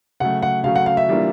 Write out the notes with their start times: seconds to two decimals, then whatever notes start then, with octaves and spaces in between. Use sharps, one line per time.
0.20 C#3 F#3 A3 F#5
0.42 F#5
0.64 C#3 F#3 A3 F5
0.76 F#5
0.86 F5
0.97 E5
1.08 E3 G3 A#3 D4 F4